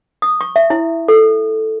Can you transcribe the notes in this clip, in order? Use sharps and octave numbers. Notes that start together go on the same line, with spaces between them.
D#6
C#6
E5
E4
A4